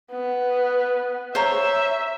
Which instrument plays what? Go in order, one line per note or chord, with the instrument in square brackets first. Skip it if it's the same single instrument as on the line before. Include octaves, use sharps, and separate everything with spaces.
[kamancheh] B3
[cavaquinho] C5 C#5 A#5 [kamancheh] E5